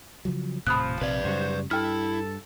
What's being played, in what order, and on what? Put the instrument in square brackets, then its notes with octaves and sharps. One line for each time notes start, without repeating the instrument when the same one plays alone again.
[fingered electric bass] C#3 F3 F#3
[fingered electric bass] D#1 A2 C3 [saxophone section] F3 [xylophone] B5 D#6 F#6
[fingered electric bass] A#1 C3 [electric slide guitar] B4 D5
[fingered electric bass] F#2 C#3 G3 [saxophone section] F#4 C5
[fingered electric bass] G2 [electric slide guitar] E4 [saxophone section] A4 [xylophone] G5 F6